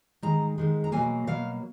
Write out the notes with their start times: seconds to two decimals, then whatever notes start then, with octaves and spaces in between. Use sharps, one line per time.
0.22 G#2 D#3 G#3 A#5
0.58 G#2 D#3 G#3
0.84 A#5
0.92 B2 F#3 A#3 G#5
1.27 B2 F#3 A#3 F5